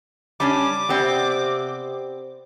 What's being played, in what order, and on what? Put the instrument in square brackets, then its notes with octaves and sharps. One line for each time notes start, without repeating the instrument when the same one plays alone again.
[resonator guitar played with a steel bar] G3 C#4 D4 [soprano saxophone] D6
[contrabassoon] C3 [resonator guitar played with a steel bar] B3 C4 D5